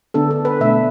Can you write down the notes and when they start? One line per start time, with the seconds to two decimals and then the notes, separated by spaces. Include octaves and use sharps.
0.14 D3 B3 D4 A4
0.31 A4
0.45 B4
0.60 B2 A3 D4 E5